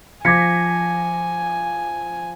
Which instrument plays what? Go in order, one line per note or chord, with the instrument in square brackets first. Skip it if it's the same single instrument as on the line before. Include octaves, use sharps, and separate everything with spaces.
[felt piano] F3 A#6 B6 [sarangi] G#5 [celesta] D6 G#6 C#7